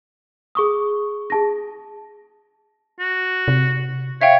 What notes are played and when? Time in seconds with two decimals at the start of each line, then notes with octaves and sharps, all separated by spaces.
0.55 G#4 C#6 D#6
1.30 G#4 A5 A#6
3.00 F#4
3.48 C3
4.21 C#5 E5 F5 G5